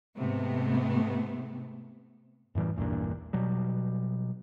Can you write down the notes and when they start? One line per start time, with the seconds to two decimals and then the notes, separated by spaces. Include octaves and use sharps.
0.18 G#2 C3 A3 B3
2.55 F#2 A2 E3 G3
2.76 A#1 E2 G2 A#2
3.33 B2 F#3 G3